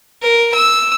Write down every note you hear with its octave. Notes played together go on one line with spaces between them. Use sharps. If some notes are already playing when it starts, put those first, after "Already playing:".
A#4
E6